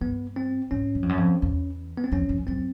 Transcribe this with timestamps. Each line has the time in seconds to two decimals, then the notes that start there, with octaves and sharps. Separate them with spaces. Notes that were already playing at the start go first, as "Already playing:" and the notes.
0.01 G2 B3
0.36 C4
0.71 G#2 C#4
0.95 F#2
1.03 F2
1.09 F#2
1.18 F2
1.42 E2
1.97 B3
2.04 C4
2.12 F2 C#4
2.29 F2
2.47 F#2 C4